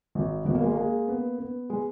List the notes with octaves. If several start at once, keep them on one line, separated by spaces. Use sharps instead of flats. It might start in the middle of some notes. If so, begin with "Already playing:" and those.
G#1
G#1 B3
A#3
G#3
A#3
G#3
B3
B3
G#3